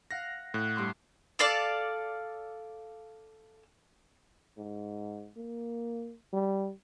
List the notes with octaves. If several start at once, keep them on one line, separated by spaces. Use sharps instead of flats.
F5 F#5 A#6
A2 F#6
G2 C6 D6
A4 D5 F5 A5
G#2
A#3
G3